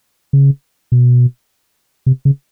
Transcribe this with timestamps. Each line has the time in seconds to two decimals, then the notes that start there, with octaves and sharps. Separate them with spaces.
0.33 C#3
0.92 B2
2.06 C3
2.25 C#3